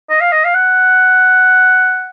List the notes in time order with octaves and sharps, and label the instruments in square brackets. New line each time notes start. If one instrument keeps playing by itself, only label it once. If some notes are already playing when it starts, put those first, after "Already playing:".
[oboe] D#5
F5
D#5
F5
F#5